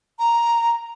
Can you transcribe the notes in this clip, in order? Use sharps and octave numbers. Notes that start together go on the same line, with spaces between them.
A#5